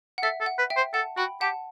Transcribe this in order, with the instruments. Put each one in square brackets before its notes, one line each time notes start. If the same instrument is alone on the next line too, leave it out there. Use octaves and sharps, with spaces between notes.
[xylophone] F#5
[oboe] A4 [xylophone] E5
[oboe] A4
[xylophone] F#5
[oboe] B4
[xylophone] E5 G5
[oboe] C5
[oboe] A4 [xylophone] F#5 A5
[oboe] F#4 [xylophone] G5 B5
[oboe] G4 [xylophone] F#5 A5